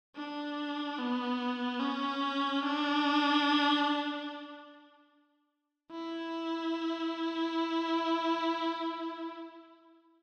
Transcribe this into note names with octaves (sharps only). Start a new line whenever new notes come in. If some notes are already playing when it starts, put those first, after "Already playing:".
D4
B3
C#4
D4
E4